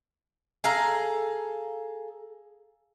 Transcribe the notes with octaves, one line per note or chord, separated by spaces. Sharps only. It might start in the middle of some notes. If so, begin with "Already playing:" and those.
G#4 A4 F5 A#5